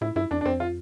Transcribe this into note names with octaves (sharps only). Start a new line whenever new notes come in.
A2 E4
G2 E4
F2 D4
D4
F2 C4
F4